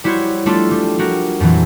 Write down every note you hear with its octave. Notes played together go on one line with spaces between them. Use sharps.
G3 E4 F#4 C5 C#5
G3 A3 D4 F4 A4 C6
G3
G3 F#4 A#4
F2 A#2 E3 F#3